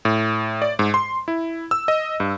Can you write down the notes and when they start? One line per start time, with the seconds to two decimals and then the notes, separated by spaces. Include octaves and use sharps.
0.05 A2
0.62 D5
0.79 G#2
0.94 C6
1.28 E4
1.71 E6
1.88 D#5
2.20 G2